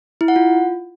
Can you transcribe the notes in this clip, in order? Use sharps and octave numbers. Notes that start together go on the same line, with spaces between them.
E4
F#5
F4